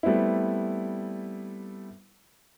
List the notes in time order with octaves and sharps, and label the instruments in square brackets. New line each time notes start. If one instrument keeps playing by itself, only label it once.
[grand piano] G3 A3 B3 C4 E4